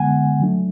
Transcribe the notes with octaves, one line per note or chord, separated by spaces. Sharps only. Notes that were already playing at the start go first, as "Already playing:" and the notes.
Already playing: D3 G#3 B3 F#5 G#5
C#3 F#3 A3 D4